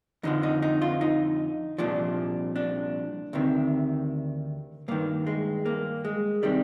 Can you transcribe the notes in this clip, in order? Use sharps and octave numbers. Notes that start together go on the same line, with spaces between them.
F2 D3 F3 D#4
D#4
D#4
F4
D#4
C2 A#2 F3 D4
D4
D2 C3 D#3
G2 D#3 A#3
G#3
A#3
G#3
C3 D#3 G3